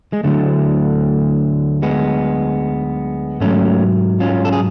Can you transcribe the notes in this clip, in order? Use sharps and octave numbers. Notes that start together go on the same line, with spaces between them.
G#3
D2 D3 F#3 A3
G#3 B3
G#2 F#3 A3 C#4
C#4 F4
A4
G#4